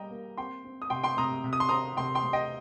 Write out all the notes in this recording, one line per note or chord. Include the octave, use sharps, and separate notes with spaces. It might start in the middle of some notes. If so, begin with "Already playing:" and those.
Already playing: G3 A#3 D#5 G5 A#5
A#3
C4 G5 C6
C4
D#6
C3 G5 C6
G5 C6
C3 A#5 D#6
C3
D#6
C6
C4 A#5 D#6
C3 G5 C6
G5 C6
C3
D#5 G5